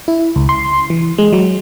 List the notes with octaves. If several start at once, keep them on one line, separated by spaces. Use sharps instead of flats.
E4
C#2
C6
E3
G#3
F#3